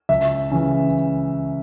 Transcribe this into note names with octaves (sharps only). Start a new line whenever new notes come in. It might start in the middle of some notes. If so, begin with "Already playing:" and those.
C#2 E5
C#3 E3